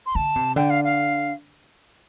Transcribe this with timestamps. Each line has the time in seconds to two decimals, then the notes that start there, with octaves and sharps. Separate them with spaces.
0.06 C6
0.15 D3 A5
0.36 C3
0.56 D3 G5
0.70 F5
0.84 F5